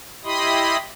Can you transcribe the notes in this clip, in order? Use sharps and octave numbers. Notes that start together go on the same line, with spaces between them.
E4 G4 D#5 B5 C6 D#6